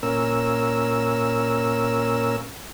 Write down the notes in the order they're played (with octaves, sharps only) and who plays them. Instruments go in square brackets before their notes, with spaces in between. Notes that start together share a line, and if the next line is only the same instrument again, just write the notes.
[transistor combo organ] A#2 C#4 A#4 E6